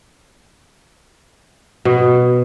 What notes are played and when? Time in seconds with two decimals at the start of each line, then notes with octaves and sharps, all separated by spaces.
1.85 B2